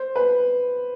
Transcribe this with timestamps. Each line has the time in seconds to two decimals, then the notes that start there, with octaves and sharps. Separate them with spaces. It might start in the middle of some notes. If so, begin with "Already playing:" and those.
Already playing: C5
0.16 B4